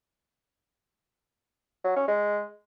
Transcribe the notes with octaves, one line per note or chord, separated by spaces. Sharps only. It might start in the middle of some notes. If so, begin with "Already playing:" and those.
F#3
C#4
G#3